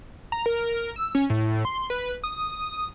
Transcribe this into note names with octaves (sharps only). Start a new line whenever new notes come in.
A#5
A#4
E6
C#4
A2
C6
B4
D#6